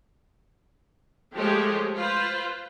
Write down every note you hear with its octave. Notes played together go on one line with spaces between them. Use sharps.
F3 G#3 A3 G4 G#4 C#5
F4 B4 C5